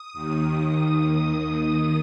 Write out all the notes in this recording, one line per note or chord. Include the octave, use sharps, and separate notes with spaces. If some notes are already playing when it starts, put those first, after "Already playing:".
Already playing: D#6
D#2 D#3
D#2 D#3 D#6
D#6